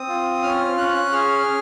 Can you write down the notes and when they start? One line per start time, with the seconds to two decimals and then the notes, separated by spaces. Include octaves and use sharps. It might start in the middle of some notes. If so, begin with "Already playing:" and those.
Already playing: C4 D#6
0.08 F4
0.43 C#4 F6
0.77 C#4 F#6
1.12 G#4 F6